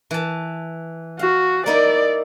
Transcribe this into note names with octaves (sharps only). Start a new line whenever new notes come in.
E3 A5
F#4 F5
A#3 D#4 E4 D5